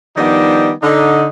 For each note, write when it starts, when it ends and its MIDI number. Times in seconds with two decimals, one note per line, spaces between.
0.17 0.71 51
0.17 0.71 53
0.17 0.71 55
0.17 0.71 59
0.17 0.71 62
0.17 0.71 63
0.82 1.28 50
0.82 1.28 63